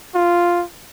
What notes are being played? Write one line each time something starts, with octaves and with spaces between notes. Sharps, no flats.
F4